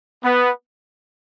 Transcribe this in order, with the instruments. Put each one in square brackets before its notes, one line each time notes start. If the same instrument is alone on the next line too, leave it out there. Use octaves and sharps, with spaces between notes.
[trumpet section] B3